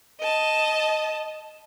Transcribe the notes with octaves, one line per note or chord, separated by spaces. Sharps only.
D#5 A5